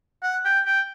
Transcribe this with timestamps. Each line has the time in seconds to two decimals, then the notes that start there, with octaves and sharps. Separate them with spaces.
0.23 F#5
0.45 G5
0.66 G5